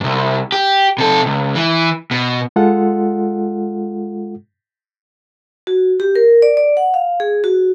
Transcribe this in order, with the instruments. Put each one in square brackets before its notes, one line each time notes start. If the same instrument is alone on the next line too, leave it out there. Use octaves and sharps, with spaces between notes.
[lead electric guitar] C2 G2
G4
C3 A4
C#2
E3
B2
[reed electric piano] G#3 F4 A4 F#5
[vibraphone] F#4
G4
A#4
D5
D5
F#5
F5
G#4
F#4